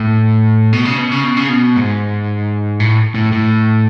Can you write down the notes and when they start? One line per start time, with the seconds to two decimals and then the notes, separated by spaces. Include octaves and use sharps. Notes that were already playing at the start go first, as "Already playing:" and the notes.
Already playing: A2
0.73 B2
0.85 C#3
0.98 B2
1.11 C#3
1.24 B2
1.37 C#3
1.49 B2
1.76 G#2
2.80 A2
3.15 A2
3.32 A2